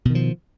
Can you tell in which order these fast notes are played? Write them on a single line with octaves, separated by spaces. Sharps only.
B2 D#3 F3